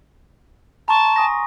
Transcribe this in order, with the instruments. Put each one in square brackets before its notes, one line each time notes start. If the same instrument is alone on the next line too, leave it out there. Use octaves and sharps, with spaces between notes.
[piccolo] A5 [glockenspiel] A#5 C6 C#6
[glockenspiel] G#5 D#6 A#6